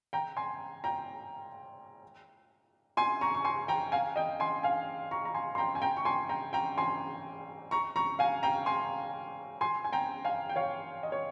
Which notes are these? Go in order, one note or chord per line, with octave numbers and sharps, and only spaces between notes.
G5 A#5
G#5 C6
G5 A#5
G#5 C6
A#5 C#6
C#6
G#5 C6
G5 A#5
F5 G#5
D#5 G5
G#5 C6
F5 G#5
A#5 C#6
A#5
G#5 C6
C6
G5 A#5
G#5
G5 A#5
C#6
G#5 C6
G5 A#5
G5 A#5
G#5 C6
A#5 C#6
A#5 C#6
F5 G#5
G5 A#5
G#5 C6
G#5 C6
G#5
G5 A#5
F5 G#5
G5
C#5 F5
D#5
C#5